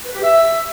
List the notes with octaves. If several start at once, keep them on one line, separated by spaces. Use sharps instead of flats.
B4
G4
E5